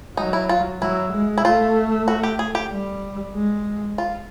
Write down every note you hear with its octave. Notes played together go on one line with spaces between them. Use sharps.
F#3 D#4
E4
F4
F#3 E4
G#3
E4
A3 F4
F#4
G4
G#4
G4
G3
G#3
F4